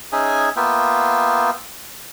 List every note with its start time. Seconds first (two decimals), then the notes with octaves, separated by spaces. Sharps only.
0.12 C#4 D#4 G#4 E5 G#5
0.56 A#3 B3 F4 E5 G5